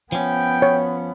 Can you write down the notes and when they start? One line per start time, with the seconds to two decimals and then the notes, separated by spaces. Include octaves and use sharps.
0.12 F3 B3 C#4 G5
0.62 C#5